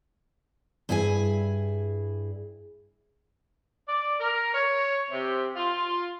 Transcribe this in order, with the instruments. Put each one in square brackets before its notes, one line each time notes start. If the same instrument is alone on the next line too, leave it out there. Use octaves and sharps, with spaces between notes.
[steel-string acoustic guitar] G2 E4 G#4 A#4 G#5
[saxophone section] D5
A#4
C#5
C3
F4